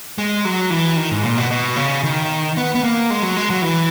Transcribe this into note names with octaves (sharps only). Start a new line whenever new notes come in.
G#3
F#3
E3
D#3
G#2
A#2
B2
B2
C#3
D#3
B3
B3
A#3
G#3
F#3
G#3
F#3
E3